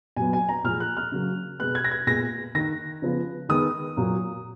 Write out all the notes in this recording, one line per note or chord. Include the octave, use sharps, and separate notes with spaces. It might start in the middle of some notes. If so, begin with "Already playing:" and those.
A#2 F#3 B3 G#5
G#5
A#5
A#2 F3 G#3 F6
F#6
F6
C#3 F#3 A#3
B2 G#3 B3 F#6
G#6
A#6
G#6
A#2 G#3 B3 A#6
D#3 A#3 A#6
C#3 F3 B3
D#3 G#3 B3 D#6
A#2 F#3 A#3